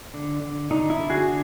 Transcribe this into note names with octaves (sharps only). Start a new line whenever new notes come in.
D3
D3
D3 D#4
E4
D3
F#4 G#4
D3